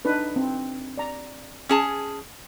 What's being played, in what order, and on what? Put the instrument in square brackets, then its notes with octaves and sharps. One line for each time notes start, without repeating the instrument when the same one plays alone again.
[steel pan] D4 D#4 B4
C4
D5 A#5
[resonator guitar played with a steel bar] C#4 G#4 A5